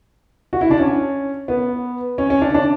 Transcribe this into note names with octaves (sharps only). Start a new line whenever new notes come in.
F#4
E4
D4
C#4
B3
C#4
C#4
D4
D4